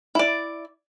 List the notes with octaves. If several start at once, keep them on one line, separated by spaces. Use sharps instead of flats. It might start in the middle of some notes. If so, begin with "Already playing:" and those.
E4 D5